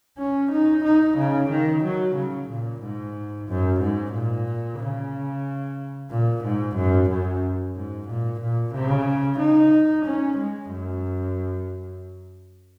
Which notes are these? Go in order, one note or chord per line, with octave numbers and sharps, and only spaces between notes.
C#4
D#4
D#4
C#3
D#3
F#3
C#3
A#2
G#2
F#2
G#2
A#2
C#3
A#2
G#2
F#2
F#2
G#2
A#2
A#2
C#3
D#4
C#4
G#3
F#2